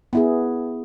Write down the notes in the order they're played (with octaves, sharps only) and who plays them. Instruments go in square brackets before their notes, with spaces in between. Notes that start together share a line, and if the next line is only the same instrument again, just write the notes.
[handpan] B3 E4 G#4